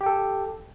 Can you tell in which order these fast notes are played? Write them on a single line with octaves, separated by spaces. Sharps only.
G4 G5 A4